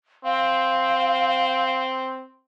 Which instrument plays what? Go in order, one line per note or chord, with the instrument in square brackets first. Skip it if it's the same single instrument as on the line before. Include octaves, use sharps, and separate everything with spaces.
[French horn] C4 [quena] F5